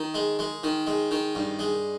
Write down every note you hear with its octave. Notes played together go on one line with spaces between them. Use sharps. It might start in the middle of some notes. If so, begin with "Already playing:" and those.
Already playing: D#3
G#3
G#3
D#3
G#3
D#3
G2
G#3